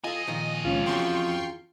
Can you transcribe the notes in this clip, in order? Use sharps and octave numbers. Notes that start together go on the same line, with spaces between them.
F2 F4 A4 D#5 G#5
A#2 D#3 F3
C#2 C#4 F4
E2 C#4 F#4 G5 C6 C#6